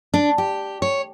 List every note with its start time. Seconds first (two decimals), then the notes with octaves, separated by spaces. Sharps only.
0.14 D4
0.38 G4
0.82 C#5